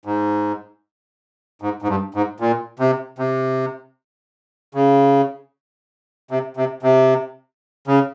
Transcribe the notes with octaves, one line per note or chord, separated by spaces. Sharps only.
G#2
G#2
G#2
G2
G#2
A#2
C3
C3
C#3
C3
C3
C3
C#3